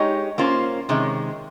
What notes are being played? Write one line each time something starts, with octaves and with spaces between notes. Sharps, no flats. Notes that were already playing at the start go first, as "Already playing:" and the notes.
Already playing: G#3 D#4 G4 C#5
A#3 C#4 F4 C5
C3 D#3 G#3 C#4